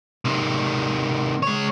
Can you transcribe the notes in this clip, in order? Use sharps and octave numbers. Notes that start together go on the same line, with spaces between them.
C3 D#3
G#3 C#5